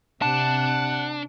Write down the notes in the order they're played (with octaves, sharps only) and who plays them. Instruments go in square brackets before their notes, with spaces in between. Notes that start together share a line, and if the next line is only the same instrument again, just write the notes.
[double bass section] C3 [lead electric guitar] D4 [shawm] F#5 [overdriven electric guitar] A5